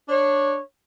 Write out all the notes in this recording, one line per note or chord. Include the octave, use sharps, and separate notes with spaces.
D4 C#5